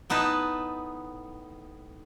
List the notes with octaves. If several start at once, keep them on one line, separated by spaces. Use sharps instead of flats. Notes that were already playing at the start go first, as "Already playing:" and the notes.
A2 B3 D#4 B4 A5